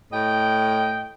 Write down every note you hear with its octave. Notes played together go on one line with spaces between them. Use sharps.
A2 D#5 G5